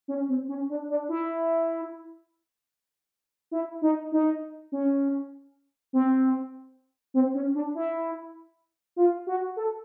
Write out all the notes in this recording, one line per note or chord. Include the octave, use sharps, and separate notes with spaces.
C#4
C4
C#4
D4
D4
E4
E4
D#4
D#4
C#4
C4
C4
C#4
D4
E4
F4
F#4
A4